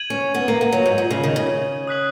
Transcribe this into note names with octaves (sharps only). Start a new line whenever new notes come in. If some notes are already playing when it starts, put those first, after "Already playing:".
Already playing: G#6 D#7 F#7
C#4
B3
A#3
A#3
F#3
G#2
A#2
C#3
D#3
C#3
D#6 F#6 B6 F#7